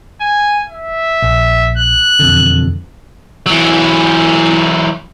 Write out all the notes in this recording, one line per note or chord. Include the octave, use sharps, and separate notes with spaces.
G#5
E5
A#1
F#6
E1 F2 D3
E3 F#3